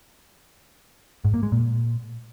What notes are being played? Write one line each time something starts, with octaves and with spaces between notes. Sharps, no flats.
G#2
A#3
G#3
A#2